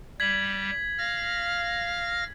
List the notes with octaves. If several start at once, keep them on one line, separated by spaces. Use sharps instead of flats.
G3 G#6 B6 F#7
F5 F6 A#6